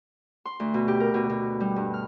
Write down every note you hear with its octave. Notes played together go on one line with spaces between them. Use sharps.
C6
D2
B2
G4
A#4
B2
B2
G3
G2
F6